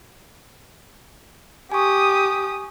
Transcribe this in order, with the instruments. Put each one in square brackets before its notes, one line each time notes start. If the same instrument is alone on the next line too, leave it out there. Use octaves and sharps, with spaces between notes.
[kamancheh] G4 D#6 [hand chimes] G#5 C#6